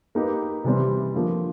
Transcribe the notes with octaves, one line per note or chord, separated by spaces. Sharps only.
A#3 D#4 G4 B4
C3 E3 G3 C4
D3 F3 A#3